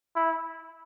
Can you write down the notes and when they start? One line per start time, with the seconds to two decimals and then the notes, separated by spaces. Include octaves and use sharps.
0.16 E4